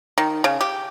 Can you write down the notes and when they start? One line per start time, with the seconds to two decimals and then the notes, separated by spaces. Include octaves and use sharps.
0.18 D#3
0.44 C#3
0.61 G4